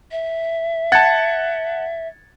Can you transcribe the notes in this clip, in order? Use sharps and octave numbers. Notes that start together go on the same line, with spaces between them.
E5
F#5 A5 G#6 A6 C#7